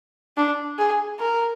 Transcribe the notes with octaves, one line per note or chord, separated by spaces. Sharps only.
D4
G#4
A#4